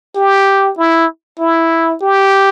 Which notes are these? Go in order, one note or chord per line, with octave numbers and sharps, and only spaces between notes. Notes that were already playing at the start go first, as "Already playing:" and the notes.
G4
E4
E4
G4